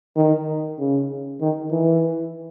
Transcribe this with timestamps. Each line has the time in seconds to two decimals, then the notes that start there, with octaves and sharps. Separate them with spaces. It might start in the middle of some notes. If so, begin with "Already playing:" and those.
0.16 D#3
0.79 C#3
1.41 D#3
1.72 E3